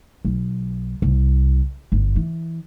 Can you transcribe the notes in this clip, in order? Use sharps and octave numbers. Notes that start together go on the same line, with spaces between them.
B1
C2
G1
E3